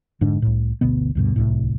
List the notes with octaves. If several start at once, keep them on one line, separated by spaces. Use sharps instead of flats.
F1 G#2 D3 D4
C2 A2
G1 D2 B2 B3
D2 G2 B2
D1 C2 A2